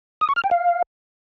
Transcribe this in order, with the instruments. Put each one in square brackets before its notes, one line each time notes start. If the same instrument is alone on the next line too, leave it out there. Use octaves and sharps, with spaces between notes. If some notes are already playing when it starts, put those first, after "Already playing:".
[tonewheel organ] D#6
C#6
F6
G5
F5